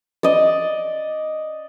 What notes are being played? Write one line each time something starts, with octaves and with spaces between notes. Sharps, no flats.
D5 D#5